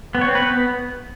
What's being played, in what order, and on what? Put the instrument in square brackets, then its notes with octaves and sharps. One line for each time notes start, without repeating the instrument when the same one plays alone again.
[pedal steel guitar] B3
C#5
C4
B4
B3